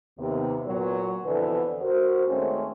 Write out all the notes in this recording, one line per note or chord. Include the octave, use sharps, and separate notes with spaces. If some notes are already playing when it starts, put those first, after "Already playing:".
D#2 C3 B3
A#2 F#3 B3
F2 B2 D3 E3 B3 B4
F#4 A#4 C5
D#2 G#3 A3 C4 C#4